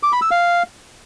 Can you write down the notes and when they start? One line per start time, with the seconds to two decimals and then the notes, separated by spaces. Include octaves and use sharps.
0.03 D6
0.12 B5
0.22 E6
0.31 F5